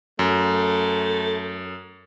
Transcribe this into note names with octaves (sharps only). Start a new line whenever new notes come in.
F#2 A3